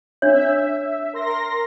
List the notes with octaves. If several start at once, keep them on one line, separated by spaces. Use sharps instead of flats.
D4 C#5 E5
A#4 C6 A#6